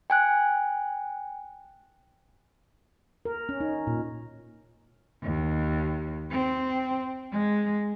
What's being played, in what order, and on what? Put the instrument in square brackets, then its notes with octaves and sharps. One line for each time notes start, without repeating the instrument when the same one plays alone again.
[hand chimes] G5 G#5 F#6
[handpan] A#4
C#4
D#4
A#2
[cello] D#2
C4
G#3